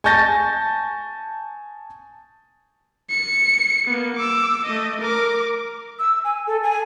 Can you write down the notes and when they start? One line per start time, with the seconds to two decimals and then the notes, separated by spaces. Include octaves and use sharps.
0.04 G#5 A5 C#6 G6 A6 A#6
3.10 C#7
3.87 A#3 B3
4.16 D6 E6
4.65 A3 D#5
5.01 A#4 D6
5.99 E6
6.24 G#5
6.47 A4
6.63 G#5